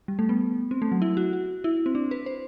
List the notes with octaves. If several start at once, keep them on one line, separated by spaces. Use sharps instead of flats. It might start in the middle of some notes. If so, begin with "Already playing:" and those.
G3
A3
B3
C4
A3
F#3
E4
F#4
F#4
E4
C4
D4
B4
C5